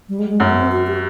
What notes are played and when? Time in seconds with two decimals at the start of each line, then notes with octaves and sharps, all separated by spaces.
0.09 G3
0.19 G#3
0.29 G#3
0.40 F#2 A3
0.50 B3
0.61 C4
0.72 F#4
0.87 G4